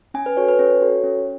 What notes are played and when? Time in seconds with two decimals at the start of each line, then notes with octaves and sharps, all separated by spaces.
0.14 C#4 G#5
0.26 B4
0.37 F#4 A4 C#5
0.48 B4
0.59 C#4 C#5
0.82 F#4 A4
1.04 C#4